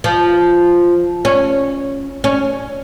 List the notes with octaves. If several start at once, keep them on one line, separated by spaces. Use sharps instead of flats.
F3
C#4
C#4